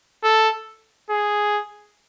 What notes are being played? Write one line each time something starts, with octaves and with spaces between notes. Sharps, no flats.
A4
G#4